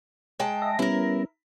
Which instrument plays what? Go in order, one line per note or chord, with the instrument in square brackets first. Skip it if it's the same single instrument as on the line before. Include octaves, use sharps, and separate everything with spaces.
[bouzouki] G#3 G5 A5
[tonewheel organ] D#5 E5 A#6
[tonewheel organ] G3 B3 C#4 [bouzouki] E4 A#4